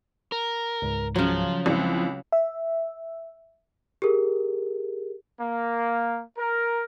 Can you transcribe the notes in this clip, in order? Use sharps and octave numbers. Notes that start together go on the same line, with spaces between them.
A#4
C#2 G#2
C#3 F3 F#3
C#2 E3 C4 E4
E5
G4 G#4 A#4
A#3
A#4